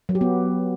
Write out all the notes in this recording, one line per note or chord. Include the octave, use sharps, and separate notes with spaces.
F#3
G4
B3